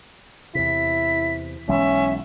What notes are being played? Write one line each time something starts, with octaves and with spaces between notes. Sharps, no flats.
E2 C3 E4 B6
B1 E3 G#3 C#4 E5